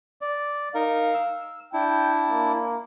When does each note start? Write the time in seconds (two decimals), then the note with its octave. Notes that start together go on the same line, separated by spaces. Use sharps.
0.21 D5
0.75 D#4 A#4 F5
1.14 E6
1.74 D4 E4 G5
2.30 A#3